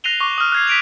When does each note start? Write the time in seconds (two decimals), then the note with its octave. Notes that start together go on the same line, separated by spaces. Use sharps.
0.04 F#6 A#6 C7 D#7 F7 G7
0.21 C#6 D6
0.38 D#6 F6
0.52 F#6 G#6 C7
0.67 B6 D7 F7